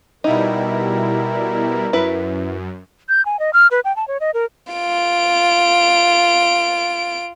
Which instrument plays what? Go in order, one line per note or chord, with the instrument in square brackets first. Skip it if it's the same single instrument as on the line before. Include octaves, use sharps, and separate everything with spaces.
[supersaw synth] B2 G3 E4 [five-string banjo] D#4 [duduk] A#4
[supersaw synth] F#2 [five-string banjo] E4 B4
[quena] G6
G#5
D#5
F6
B4
G5
A5
C#5
D#5
A#4
[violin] F4 D7